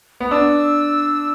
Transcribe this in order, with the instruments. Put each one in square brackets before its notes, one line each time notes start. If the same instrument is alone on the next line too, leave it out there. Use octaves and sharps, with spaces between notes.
[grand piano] B3
[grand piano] D4 [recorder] E6